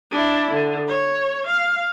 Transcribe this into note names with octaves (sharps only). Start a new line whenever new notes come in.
D4 E4
D3
C#5
F5